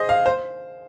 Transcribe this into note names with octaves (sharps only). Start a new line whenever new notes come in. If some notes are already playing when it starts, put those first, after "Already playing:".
Already playing: G#4 C5 D#5
F5
C5